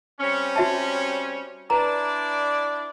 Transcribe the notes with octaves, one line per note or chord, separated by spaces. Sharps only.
G3 C4 C#4
F#4 E5 A5
D4 E4 B4 D5 A#5